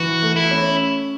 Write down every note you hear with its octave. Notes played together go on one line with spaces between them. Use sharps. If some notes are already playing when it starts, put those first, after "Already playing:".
Already playing: E3 F#4
A3
E4
C#4